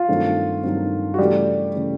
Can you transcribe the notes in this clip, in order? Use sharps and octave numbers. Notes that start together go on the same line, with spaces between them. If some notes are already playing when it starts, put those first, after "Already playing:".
Already playing: F4
G2 D#3 F#3 A3 C4
G2 D#3 F#3 A3 C4
F#4
C#3 E3 G3 A3 G4
C#3 E3 A3